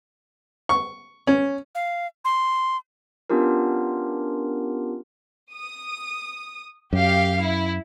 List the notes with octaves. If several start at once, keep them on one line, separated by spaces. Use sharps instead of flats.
C#6
C#4
F5
C6
B3 C#4 D4 F4 G4 A#4
D#6
F#2 G4 F5
E4